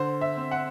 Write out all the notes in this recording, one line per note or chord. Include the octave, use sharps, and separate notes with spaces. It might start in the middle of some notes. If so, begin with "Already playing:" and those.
Already playing: D3 C5
E5
C4
F#5